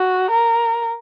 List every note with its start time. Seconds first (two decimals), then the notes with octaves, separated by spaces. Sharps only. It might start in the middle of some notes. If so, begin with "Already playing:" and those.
Already playing: F#4
0.31 A#4